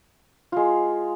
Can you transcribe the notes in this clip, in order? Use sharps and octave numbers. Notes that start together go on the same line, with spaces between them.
G#3 F4